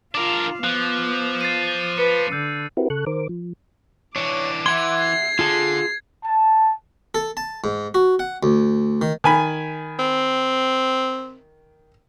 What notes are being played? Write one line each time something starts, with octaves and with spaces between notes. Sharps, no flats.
D4 F4 A#4 F5 D6
F3 B3 F#6
A6 C7 D#7
B4 C#7 D#7
D3 E6 G6
C4 E4 F#4 G4 A#4 B4
C#3 A4 C#6 F#6
D#3 A#4 C5 D6
F3
E3 D4 C#5 D6
E3 E5 F#5 C6 G#6
C7
D3 F4 G#4 A5
A5
A4
A5
G#2
F#4
F#5
D2
D#3
D#3 G#5 B5
C4